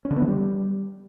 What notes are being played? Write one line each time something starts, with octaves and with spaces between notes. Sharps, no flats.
C#4
D3
B3
E3
G3